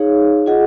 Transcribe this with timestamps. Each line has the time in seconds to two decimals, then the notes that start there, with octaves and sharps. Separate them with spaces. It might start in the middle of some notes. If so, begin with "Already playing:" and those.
Already playing: D#4 G#4 C#5 F5
0.46 F4 G#4 D#5 F#5